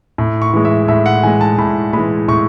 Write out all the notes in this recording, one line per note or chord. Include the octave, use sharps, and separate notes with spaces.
A2
C#6
E3 G#3
E5
A2 E5
F#5
E3 G#3 G#5
A5
A2 B5
E3 G#3 B5
A2 C#6